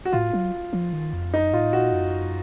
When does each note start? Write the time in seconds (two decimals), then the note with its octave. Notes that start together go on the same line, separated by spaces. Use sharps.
0.05 F#4
0.13 A2 F4
0.33 F#3
0.73 F3
0.93 D#3
1.13 F2
1.33 F#2 D#4
1.53 A2 F4
1.73 A#2 F#4
1.93 F#2